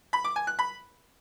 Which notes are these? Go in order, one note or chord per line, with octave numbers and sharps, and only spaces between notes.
B5
D6
G#5
F#6
B5